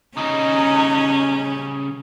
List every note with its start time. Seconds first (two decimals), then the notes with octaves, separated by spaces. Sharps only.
0.17 C#3 G3 C#4 D#4